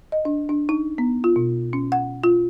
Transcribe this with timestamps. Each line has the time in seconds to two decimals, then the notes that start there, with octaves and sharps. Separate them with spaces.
0.12 D#5
0.25 D4
0.49 D4
0.69 D#4
0.98 B3
1.24 F4
1.36 B2
1.73 C#4
1.92 F#5
2.24 F4